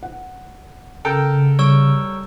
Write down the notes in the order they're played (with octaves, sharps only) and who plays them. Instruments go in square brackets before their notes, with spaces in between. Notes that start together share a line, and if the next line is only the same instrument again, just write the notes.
[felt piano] F#5
[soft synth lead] C#3 [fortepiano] A4 A#4 G5
[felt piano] G3 [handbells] C#5 C#6 E6